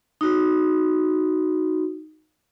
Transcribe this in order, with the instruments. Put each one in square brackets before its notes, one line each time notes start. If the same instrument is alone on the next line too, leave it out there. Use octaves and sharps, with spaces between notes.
[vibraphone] D#4 F#4